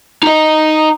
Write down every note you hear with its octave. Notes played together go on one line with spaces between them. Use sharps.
D#4 D#5